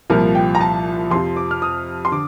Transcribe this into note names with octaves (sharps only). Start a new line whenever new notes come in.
C2 A#2 F3 A#4
G5
A#5
A5
F2 C3 F3 C6
D6
F6
D#6
C6
D3 D6